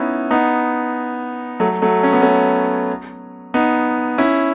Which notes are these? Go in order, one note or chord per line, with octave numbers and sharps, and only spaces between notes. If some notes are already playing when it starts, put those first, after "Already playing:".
Already playing: B3 C#4 D#4 E4
B3 D#4
F#3 A3
F#3 A3
C#4
B3
A3 C#4
B3 D#4
C#4 E4